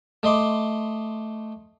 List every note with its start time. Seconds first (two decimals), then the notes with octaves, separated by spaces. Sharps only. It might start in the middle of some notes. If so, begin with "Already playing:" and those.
0.23 A3 D#5 C6 D6